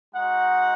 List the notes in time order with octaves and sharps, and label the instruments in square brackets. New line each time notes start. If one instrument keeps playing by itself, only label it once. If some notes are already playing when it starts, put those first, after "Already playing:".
[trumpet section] G#3 D#4 F#4 F#5